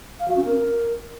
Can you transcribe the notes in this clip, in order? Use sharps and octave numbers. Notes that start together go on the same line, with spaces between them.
F5
F#4
C#4
A#4